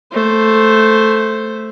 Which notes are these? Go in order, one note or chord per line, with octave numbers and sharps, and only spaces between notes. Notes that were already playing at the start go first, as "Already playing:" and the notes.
A3 C5